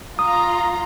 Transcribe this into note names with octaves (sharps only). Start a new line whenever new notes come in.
F4 A#5 D#6